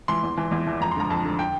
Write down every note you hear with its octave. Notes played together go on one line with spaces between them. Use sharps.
E3 C6
E2
E3
E2
E3
F2 A#5
C6
D3 F3 A#5
F2 A5
D3 F3
G5